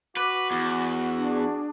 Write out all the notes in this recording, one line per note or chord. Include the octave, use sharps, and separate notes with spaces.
F#4 B4 D6
E2
D4 G#4